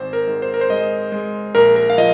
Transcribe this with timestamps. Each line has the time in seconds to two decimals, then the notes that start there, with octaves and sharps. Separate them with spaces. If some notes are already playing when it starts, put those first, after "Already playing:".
Already playing: G#1 C5
0.13 A#4
0.27 G#2
0.42 C5
0.54 A#4
0.61 C5
0.70 G#3 D#5
1.12 G#3
1.55 A#1 A#4
1.76 A#4
1.90 F5
1.98 F3 D#5